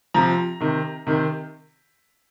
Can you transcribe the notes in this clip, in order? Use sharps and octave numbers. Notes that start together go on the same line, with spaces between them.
C3 F3 A#5
C3 D#3
C3 D#3